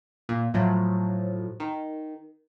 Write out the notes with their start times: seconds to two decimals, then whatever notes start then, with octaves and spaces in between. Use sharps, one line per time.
0.29 A#2
0.54 A2 F3 F#3
1.60 D#3